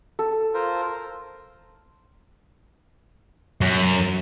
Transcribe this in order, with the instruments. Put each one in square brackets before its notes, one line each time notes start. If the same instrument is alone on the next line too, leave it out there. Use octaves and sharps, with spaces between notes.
[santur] A4
[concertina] F4 A#4 C5
[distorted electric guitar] F#2